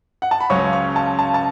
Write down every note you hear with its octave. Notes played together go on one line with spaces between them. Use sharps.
F#5
A5
B5
C#2 C#3 F#3 C#4 C#6
C#6
A5
A5
A5